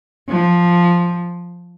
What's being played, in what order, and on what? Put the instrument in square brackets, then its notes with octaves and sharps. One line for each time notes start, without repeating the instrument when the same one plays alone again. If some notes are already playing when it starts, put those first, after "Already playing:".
[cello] F3